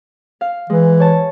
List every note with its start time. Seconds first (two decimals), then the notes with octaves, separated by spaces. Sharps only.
0.41 F5
0.70 E3 G#3
1.00 C#5 A5